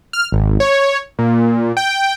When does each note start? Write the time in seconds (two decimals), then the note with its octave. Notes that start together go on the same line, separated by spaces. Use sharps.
0.13 F6
0.32 G#1
0.60 C#5
1.19 A#2
1.77 G5